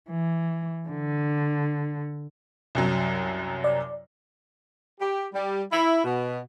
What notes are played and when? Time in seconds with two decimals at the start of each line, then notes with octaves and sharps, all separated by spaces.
0.10 E3
0.89 D3
2.75 C2 F#2 F#3
3.64 D5
4.99 G4
5.32 G3
5.71 E4
6.04 B2